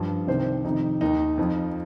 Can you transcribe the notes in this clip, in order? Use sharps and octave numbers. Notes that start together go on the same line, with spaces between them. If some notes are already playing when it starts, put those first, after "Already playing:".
Already playing: G2 F3
C2 C3 D#3 C5
F2 C3 D#3 D#4
D#2 D#3 D#4
F2 F3